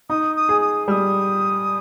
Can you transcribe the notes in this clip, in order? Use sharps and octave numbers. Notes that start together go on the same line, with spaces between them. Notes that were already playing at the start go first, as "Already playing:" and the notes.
D#4 D#6
D#6
G#4
D#6
G3 D#6 F6